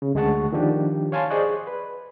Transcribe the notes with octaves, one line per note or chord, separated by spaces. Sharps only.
C#3
D2 G#3 G#4 F#5 A5 C#6
D#3 F3 D4 G4
C#5 F5 G#5 A5 C6
G#4 C5 D5 D#5 C#6 F#6
B4